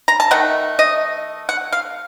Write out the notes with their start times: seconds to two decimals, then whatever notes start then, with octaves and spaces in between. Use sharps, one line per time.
0.08 A#5
0.20 A5
0.31 D#3 A3 F#5
0.79 D#5
1.49 F#5
1.72 F5